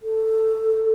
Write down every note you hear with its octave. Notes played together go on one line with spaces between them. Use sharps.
A4